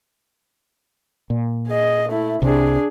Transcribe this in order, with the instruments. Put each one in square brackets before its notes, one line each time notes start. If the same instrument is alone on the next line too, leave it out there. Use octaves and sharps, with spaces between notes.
[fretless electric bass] A#2
[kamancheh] G#4 D#5
A3 E4
[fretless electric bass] C2 C3 [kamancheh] D4 G#4